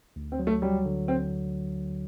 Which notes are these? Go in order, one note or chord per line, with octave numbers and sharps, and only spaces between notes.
D2
C4
F#3
A3
F#3 G3
D3
C4